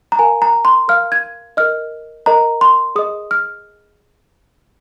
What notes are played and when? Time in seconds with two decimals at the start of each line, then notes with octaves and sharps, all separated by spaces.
0.12 A#5
0.19 A#4 F5 G#5
0.42 A#5
0.65 C6
0.88 A#4 F5 F6
1.12 G#6
1.57 A#4 D#5 F6
2.26 A#4 D#5 A#5
2.61 C6
2.96 G#4 D#5 D#6
3.31 F6